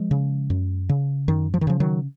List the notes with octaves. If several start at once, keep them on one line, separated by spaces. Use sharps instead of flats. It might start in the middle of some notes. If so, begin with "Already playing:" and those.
Already playing: F3 G#3
C#3
F#2
C#3
F#2 D#3
F3
D#3
C#3 F3
D#3 F#3